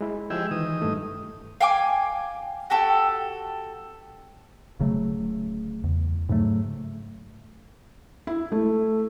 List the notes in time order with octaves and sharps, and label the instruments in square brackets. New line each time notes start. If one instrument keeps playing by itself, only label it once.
[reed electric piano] G#3 E4
[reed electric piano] F3 G#3 [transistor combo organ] G4 G#4 E5
[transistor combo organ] D#3 D#6 [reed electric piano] E3
[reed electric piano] G2 A3
[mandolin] F5 G5 G#5 D6
F#4 G4 A4 G5
[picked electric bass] D1 C#3 F#3 A3
E2
G#2 C#3 F#3 A3
[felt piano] E4
A3